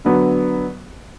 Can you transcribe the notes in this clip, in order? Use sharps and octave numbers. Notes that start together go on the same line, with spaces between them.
D3 F#3 B3